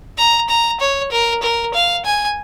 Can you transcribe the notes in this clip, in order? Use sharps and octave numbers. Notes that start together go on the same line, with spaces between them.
A#5
A#5
C#5
A#4
A#4
F5
G#5